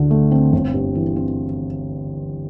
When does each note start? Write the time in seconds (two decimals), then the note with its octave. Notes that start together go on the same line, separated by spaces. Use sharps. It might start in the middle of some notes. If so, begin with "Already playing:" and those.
Already playing: D2 D3
0.11 A3
0.31 C4
0.52 G1
0.74 G2
0.95 E3
1.16 C4